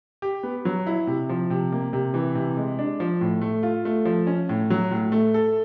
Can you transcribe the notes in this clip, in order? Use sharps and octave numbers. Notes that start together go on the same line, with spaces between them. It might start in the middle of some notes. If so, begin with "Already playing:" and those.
G4
B3
F#3
E4
C3
F3
C3
A#3
C3
E3
C3
G#3
D4
F3
A2
A3
F4
A3
F3
C#4
A2
F#3
A2
A3
A4